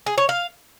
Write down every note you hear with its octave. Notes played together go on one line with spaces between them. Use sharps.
G#4
C#5
F5